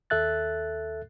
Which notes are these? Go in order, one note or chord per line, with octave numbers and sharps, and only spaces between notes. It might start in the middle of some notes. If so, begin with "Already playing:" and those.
D#2 A4 E5 F#6 A6